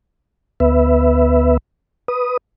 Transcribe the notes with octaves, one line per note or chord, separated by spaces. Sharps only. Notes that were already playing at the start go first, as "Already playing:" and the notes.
D2 B3 B4 E5
B4 D#6